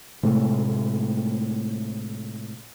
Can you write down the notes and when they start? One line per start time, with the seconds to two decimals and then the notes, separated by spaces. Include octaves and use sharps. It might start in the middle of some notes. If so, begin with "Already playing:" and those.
0.23 A2 C3 G#3 A3